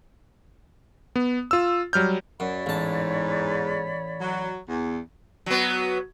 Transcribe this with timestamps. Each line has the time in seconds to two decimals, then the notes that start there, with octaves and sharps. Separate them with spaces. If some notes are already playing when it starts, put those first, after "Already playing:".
1.16 B3
1.51 F4 E6
1.93 F#3 G3 F6 G6
2.40 F#2 C#5 D5 B5
2.66 A1 E2 G#2 A5
4.21 F#3
4.67 E2
5.46 F#3 B3